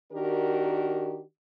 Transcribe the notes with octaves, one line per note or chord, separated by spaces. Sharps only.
D#3 D4 F#4 G4 A#4